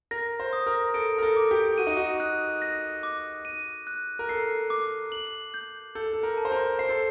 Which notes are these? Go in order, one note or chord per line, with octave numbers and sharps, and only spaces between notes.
A#4 A#6
C5
D#6
A#4
A4 D7
A#4
A4
D6
G4
F#4 D#7
D#4
F#4
F#6
A#6
D6
D#7
F#6
A#4
A4 C7
D6
F#7
G6
A4 G6
A4
A#4
A5
C5
A#4
C5 C7
A4